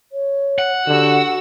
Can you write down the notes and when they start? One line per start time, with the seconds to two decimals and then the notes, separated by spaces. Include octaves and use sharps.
0.12 C#5
0.58 F#5
0.87 D3 F#4 G4 E6